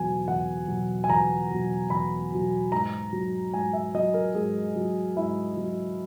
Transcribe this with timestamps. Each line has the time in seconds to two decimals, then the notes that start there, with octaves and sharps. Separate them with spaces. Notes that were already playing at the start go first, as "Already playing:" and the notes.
Already playing: E2 B2 F#3 G#5
0.28 E2 F#5
0.68 B2 F#3
1.04 G#5
1.09 E2 A#5
1.50 B2 F#3
1.90 E2 B5
2.32 B2 F#3
2.72 G#2 A#5
3.13 F#3
3.53 G#2 G#5
3.73 E5
3.94 F#3 D#5
4.14 A#4
4.35 G#2 G#4
4.76 F#3
5.16 G#2 E4
5.57 F#3